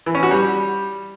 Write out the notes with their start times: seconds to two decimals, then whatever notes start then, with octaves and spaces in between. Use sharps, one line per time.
0.06 E3
0.15 C#4
0.23 F#4
0.31 G3